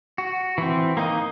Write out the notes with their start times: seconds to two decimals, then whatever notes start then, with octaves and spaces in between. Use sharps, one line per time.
0.18 F#4
0.58 E3 C4
0.97 A#3 D#4 D#5